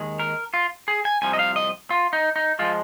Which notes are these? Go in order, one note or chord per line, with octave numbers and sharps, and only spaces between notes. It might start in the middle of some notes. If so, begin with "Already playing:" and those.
Already playing: D#2 D#3 G#3
A#4
F4
G#4
G#5
C2 C3 F3 G#5
D#5
F5
D#5
F4
D#4
D#4
F3 G#3 F4